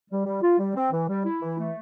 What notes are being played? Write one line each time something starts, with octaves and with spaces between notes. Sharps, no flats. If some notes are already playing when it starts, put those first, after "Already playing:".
G3
G3
F4
G3
C4
E3
G3
E4
E3
A3